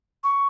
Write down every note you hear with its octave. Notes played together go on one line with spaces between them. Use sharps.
C#6